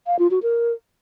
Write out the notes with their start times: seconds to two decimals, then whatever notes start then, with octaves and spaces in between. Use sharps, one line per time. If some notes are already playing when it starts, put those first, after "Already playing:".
0.07 F5
0.19 F4
0.31 F#4
0.43 A#4